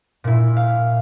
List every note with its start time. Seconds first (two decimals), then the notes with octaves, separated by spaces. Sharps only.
0.24 A#2 E4
0.57 F5